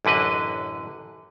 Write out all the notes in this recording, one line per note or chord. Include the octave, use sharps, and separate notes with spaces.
A1 F#2 D3 B4 D#5